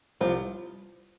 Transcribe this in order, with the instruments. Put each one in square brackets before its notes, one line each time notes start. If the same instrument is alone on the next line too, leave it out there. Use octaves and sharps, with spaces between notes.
[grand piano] C2 [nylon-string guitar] F3